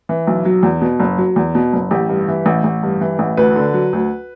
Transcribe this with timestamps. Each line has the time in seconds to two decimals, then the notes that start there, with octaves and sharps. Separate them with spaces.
0.09 E3
0.27 B1
0.45 F#3
0.63 E2
0.81 B2
0.99 F#1
1.18 F#3
1.36 E2
1.55 B2
1.73 F#1
1.91 A1 G4
2.09 G2
2.28 E3
2.46 A1
2.64 A1
2.83 G2
3.01 E3
3.19 A1
3.37 D2 B4
3.56 D3
3.74 F#3
3.93 D2